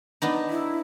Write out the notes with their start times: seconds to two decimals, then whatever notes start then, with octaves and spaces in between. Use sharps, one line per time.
0.22 B3 D4 D#4
0.50 E4